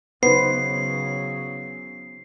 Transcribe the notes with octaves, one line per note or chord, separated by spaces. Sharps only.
C#3 F#3 B3 D#4 B4 C5 C7